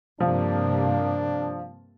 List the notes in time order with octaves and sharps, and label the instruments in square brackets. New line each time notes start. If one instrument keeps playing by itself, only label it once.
[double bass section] G2 C3 A#3 [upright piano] F3 [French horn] D4